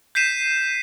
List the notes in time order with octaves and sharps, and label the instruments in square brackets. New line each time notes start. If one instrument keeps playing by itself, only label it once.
[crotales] G6 B6 C7 D#7 E7